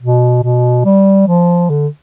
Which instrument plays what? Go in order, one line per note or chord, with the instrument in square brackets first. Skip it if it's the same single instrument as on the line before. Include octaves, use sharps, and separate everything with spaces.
[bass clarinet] B2
B2
G3
F3
D3